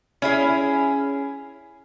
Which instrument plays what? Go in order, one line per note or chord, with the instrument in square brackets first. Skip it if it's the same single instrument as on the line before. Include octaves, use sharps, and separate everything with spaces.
[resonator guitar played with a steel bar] C#4 E4 G#4